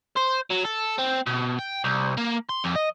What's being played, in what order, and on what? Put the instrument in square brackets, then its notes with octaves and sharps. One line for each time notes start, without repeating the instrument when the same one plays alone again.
[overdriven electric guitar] C5
F#3
A4
C4
B2
G5
C2
A#3
C6
F2
D#5